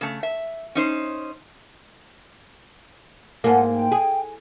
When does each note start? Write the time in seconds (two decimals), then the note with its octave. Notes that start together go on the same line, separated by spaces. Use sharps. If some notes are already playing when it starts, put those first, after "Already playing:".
0.01 C#3 A3
0.23 E5
0.75 C#4 D#4 C5
3.44 G#2 A#3 F#5 G#5 A5
3.72 G5
3.92 G#4